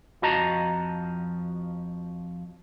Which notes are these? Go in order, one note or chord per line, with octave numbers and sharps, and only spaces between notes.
F2 F3 F#4 D#5 A5 A#5